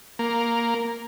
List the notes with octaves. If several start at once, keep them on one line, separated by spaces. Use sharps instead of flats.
A#3